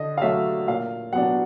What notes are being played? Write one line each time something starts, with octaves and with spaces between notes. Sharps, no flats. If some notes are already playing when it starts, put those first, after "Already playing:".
Already playing: D3 D#5
F5
F#3 A3 E5
A#2 F5
F#3 B3 D4 F#5